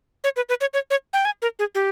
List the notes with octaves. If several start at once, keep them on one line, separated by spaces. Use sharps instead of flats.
C#5
B4
B4
C#5
C#5
C#5
G5
G#5
A#4
G#4
G4